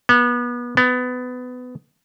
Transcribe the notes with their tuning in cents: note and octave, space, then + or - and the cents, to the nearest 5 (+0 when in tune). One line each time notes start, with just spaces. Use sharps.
B3 -30
B3 +20